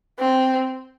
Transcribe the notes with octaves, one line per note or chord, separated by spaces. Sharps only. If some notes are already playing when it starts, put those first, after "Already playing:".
C4